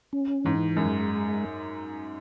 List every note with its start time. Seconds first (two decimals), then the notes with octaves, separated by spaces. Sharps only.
0.13 C#4
0.45 G#2 E3
0.76 F#2 G#3